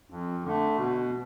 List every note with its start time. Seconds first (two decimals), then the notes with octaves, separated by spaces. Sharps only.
0.10 F2
0.44 D3 A3
0.77 B2